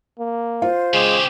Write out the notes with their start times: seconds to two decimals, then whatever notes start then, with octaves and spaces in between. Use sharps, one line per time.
0.19 A#3
0.62 F4 C5
0.93 C#3 G#3 G4